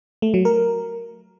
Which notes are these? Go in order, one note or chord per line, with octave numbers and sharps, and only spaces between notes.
A3
F#3
A#4